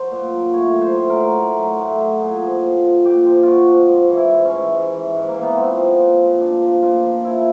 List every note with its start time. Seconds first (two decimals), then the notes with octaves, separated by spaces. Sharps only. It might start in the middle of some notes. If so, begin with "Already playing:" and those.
Already playing: F#3 C5
0.11 A#2
0.33 F#3
0.53 A2 C#5
0.74 F#3
0.81 C5
0.96 A2
1.10 A#4
1.16 F#3
1.38 A2
1.58 F#3
1.79 A2
2.00 F#3
2.21 A#2 G#4
2.42 F3
2.63 A#2
2.84 F3
3.05 A#2 G4
3.26 F3
3.43 A#2 F4 F#4
3.68 F3
3.89 G#2
4.10 E3
4.17 E4
4.31 G#2
4.45 C#4
4.51 E3
4.73 G#2
4.94 E3
5.15 G#2
5.28 A#3
5.35 E3
5.43 B3
5.56 A#2 C4
5.77 F3
5.99 A#2
6.20 F3
6.40 A#2 D4
6.62 F3
6.83 A#2 F4
7.04 F3
7.24 A#2 E4